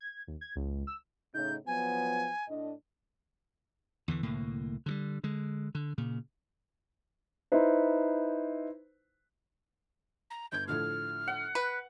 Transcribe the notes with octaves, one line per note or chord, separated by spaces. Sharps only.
G#6
D#2
G#6
C#2
E6
A2 C#3 D#4 G6
F3 F#3 B3 G#5
A2 D4 D#5
E2 D3 E3
C2 A2 D3 A#3
D3 D#3 G3
D3 G#3
D3
A#2 C#3
D#4 E4 B4 C5
A#5
G1 G6 G#6
A2 D3 F3 F6
F#5
B4